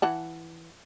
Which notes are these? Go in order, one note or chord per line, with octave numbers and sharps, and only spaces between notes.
E3 F#5 A5